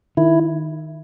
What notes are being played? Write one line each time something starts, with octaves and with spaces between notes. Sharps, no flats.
D#3 E4